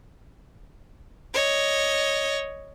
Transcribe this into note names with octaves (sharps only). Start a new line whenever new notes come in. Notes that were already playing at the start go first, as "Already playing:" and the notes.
C#5 D#5